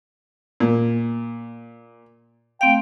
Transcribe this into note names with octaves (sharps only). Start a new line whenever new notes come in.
A#2
A3 C4 F5 G5